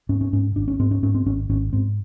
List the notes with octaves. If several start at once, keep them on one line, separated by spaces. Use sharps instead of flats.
G#2 C#4
C#4
G#2 C#4
G#1 D4
C#4
G#2 C4
C#4
G#2 C#4
C4
G#1 C#4
G#1 C#4
G#2 C4